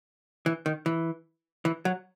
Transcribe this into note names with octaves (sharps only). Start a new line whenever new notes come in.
E3
D#3
E3
E3
F#3